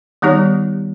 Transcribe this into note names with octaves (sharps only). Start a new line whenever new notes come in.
D#3 G3 B3 D#4 G4 C#5